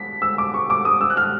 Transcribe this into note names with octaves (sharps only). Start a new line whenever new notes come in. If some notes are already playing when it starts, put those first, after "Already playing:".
Already playing: B6
E6
D6
C#6
D6
D#6
E6
F#6
F6